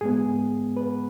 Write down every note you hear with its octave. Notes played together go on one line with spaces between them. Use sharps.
G#2 G#3 B3 G#4
B4